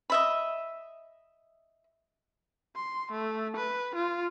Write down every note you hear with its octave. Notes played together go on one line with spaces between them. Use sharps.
D#5 E5 B5
C6
A3
B4
F4